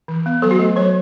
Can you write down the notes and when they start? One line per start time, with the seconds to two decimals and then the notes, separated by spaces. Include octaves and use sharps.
0.08 E3
0.26 B3
0.42 F#3 A4
0.51 F#4
0.59 A3 A4
0.76 F#3 C#5